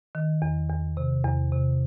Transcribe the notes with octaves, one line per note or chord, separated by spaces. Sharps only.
D#3
E2
E2
C3
E2
C3